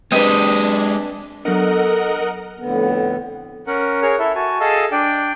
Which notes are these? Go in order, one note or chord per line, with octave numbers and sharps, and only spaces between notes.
G#3 C4 D4 G4 B4 D#5
F#3 B3 D4 A4 A#4 D#5 F#5
F2 A2 D3 B3
C#4 A#4 F#5
G#4 A#4 C#5
E4 A4 E5
F#4 G#5 A5
G#4 A4 D#5 F5 A5 E6
D4 D5 G5